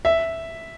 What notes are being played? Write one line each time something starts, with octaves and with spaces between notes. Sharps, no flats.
E5